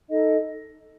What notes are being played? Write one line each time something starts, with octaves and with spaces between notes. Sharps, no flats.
D#4 A4 D#5